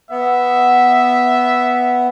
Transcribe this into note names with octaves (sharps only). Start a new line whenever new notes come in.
B3 E5